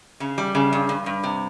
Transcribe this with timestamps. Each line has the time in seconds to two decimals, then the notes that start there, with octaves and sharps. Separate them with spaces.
0.20 C#3
0.38 G3
0.55 C#3
0.73 G2
0.89 G2
1.06 G2
1.24 C3